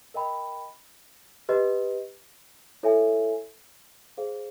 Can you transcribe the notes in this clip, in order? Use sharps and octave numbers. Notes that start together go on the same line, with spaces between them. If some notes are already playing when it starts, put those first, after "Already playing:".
A#4 D#5 G5 B5
G4 B4 D#5
E4 A4 C#5 E5 G#5
G#4 C5 F5